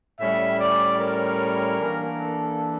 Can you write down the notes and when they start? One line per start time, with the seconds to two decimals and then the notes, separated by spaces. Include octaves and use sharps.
0.19 A2 G3 C#4 E5
0.59 D5
1.00 A#4
1.79 E3 A#3 D4
2.19 A4